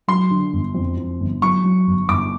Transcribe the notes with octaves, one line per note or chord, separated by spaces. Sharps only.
F#3 C6
D3
G1
F2
F2
G1
F#3 C#6
F#3
G1
G1 D6